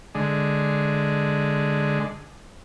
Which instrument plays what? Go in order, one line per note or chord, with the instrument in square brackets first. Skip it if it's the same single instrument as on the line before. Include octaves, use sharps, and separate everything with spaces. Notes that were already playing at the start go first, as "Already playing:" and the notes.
[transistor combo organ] D3 G#3